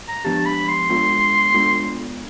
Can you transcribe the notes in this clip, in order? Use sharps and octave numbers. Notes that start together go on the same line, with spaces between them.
A#5
F3 G#3 B3 D4 G4 A5
B5
C6
G#3 B3 D4 F4 A4
G#3 B3 D4 F4 A4